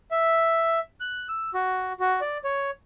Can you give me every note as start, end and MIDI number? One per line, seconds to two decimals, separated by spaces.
0.11 0.79 76
1.00 1.27 90
1.29 1.50 88
1.54 1.93 66
2.00 2.20 66
2.21 2.38 74
2.44 2.70 73